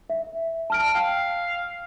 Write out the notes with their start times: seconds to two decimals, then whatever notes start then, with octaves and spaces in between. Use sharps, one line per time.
0.10 E5
0.70 A5 F6 D7
0.95 F5 G5